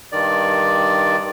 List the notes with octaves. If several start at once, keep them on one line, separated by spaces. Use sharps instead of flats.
G2 D#3 D5